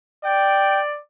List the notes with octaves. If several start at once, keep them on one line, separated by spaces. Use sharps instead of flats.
D5 G5